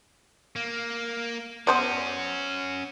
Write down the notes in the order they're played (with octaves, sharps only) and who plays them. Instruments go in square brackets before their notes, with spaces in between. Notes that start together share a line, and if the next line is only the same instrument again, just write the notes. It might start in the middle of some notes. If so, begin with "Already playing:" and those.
[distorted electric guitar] A#3
[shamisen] B3 C5 D5 [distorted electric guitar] C#4 F#4